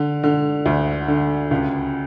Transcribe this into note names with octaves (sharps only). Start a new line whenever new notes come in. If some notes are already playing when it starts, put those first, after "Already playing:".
Already playing: D3
D3
D2
D3
C#2